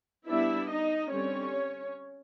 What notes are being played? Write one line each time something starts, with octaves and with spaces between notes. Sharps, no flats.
G3 B3 D4 E4 E5
D#4 D#5
D3 G3 C4 C#4 C#5